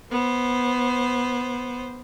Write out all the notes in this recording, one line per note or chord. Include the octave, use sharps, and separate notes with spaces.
B3 C5